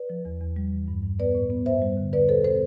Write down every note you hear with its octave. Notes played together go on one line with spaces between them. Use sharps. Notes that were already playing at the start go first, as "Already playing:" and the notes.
Already playing: B4 D5
F3
E2
E2
G3
E3
G2
G2
B3 B4 D5
A2
B3
G2 C5 E5
G3
D3
E2 B4 D5
B2 A4 C5
B3 A4 C5